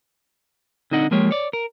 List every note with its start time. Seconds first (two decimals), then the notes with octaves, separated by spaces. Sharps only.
0.91 D3 C4 D#4 D#5 F#5
1.11 F3 G#3 A#3 G4 C#5
1.31 C#5 D5
1.53 A#4